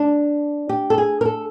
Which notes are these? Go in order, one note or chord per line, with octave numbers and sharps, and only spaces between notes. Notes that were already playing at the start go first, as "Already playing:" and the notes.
Already playing: D4
G4
A4
G#4
A#4
A4